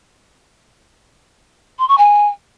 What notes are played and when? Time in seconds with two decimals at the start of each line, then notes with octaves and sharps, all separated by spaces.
1.78 C6
1.88 C#6
1.98 G#5